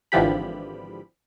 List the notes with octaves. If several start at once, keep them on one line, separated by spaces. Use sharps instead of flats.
G#1 D3 E3 F3 G4 B5